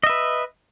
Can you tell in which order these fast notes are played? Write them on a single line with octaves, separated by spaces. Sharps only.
D#5 E5 B4